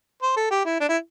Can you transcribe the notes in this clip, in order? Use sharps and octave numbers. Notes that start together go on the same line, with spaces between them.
C5
A4
G4
E4
D4
E4